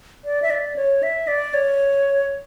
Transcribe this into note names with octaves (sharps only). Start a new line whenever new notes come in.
D5
E5
D5
C#5
E5
D5
C#5